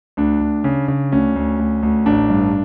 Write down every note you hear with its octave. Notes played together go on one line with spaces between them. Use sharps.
D2 D4
D2
C#3
C#3
D2 C#4
D2
D2
D2
A1 D4
G2